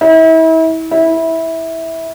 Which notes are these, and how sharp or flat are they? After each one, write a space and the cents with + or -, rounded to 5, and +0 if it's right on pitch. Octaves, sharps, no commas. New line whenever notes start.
E4 -35
E4 -15